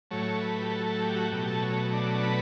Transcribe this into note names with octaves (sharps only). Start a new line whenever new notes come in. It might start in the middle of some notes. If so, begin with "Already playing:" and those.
A2 F#3 A3 C#5
B4
G4
A4
A4
G4
F#4
B2 F#3 A3 G4
A4
C#5
D4
B4